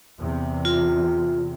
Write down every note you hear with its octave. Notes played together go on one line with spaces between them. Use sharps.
E2 C3
F4